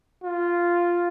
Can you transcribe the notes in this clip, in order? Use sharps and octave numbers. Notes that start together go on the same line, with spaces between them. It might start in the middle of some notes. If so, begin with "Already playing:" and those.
F4